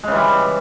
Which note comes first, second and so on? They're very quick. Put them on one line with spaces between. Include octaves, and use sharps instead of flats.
G#3 C#3 E3 G3